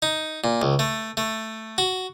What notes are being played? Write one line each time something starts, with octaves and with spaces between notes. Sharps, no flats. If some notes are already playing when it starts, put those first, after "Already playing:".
D#4
A#2
C#2
A3
A3
F#4